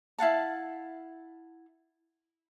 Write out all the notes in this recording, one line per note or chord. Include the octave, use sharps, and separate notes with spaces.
E4 F5 F#5 A5